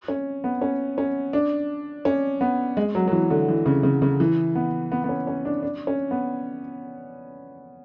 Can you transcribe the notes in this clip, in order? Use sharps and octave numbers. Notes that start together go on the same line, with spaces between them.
C#4
B3
C#4
C#4
D4
C#4
B3
G#3
F#3
F#3
E3
D3
E3
C#3
C#3
C#3
E3
B3
B3
B3
C#4
C#4
D4
D4
C#4
B3